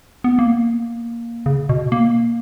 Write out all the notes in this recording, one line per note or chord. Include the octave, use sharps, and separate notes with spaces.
B3
A#3
C#3
B2
A#3